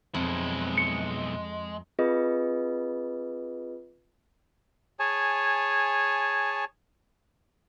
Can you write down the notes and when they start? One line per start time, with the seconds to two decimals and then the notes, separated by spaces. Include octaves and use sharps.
0.14 B1 F2 G#3 E4
0.78 C#7
1.99 C4 F4 G#4 B4 D#5
4.99 G#4 C#5 G#5 A5